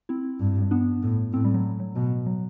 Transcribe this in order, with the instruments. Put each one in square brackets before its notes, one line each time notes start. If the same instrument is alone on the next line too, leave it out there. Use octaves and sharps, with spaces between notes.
[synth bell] C4 E4
[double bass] G2
[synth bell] B3 D4
[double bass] A2
[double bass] A2 [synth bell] C4
[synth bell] G3
F#3
F#3
[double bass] B2
[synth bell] F#3